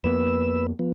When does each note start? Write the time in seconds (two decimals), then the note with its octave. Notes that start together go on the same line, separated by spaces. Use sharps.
0.04 F2 A#3 B3 B4 E6
0.79 F3 B3